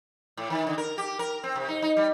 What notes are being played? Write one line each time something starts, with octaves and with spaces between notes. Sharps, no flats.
A2
D#3
D3
A#4
G4
A#4
C4
C3
D#4
D#4
G3